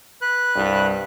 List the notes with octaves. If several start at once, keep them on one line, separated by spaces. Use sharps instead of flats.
B4 F#6
C2 G2